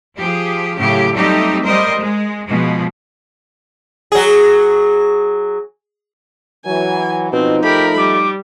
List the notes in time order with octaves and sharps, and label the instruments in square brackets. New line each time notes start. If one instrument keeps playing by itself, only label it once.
[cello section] F3 G4 G#4
A2 C#3 F#3 G4
F#3 G3 A3 C4 D#4 G4
G3 A#4 C5 D#5
G#3
B2 F3 G#3
[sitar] F#3 G#4
[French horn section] E3 F#3 [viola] G#5
[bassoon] B2 [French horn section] F3 D#4 [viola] C4
[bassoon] A3 [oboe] G4 [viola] A#4 B5
[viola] G3 [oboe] D6